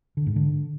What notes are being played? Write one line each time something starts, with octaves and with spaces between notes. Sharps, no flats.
D3
G#2
D3